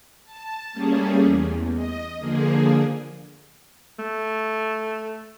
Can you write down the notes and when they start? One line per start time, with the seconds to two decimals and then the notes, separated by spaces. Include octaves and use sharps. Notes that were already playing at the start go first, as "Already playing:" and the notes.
0.25 A5
0.73 G3 A3 A#3 C#4 G#4
1.22 E2
1.75 D#5
2.19 D3 F3 A#3 G#4
3.99 A3